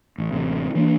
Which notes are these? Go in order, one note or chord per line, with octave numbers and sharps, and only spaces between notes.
A1
A1 C3
E3 A#3 D4